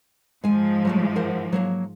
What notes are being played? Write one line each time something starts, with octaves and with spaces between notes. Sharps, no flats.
G#2 F3 G#3 G#5
F#3 G3 A3
A#4 C5 F#5
F#3 A#3 C#5